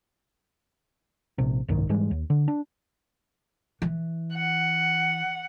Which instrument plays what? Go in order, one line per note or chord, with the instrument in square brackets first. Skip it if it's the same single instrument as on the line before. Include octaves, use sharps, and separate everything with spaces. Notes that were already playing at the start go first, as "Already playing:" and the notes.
[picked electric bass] A#1 C3
F#1 C2 G#2 D#3
G#2 E3 G3 G#3
D#2
D3
D4
[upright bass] E3
[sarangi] F#5